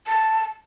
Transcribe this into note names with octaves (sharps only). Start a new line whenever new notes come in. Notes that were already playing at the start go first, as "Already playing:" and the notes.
A5